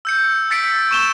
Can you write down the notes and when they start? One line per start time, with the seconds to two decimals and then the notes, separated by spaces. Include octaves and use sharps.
0.05 E6 G6 C#7
0.50 E6 A6 B6 C#7 D7
0.91 C#6 E7 G7